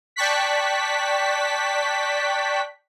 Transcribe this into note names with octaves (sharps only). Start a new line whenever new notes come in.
D5 G5 A5 C#6 F#6 B6